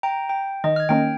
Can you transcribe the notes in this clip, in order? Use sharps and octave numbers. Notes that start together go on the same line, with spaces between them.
G5 A#5
G5
D#3 D#5
F6 G#6
D#3 A#3 C#4 G5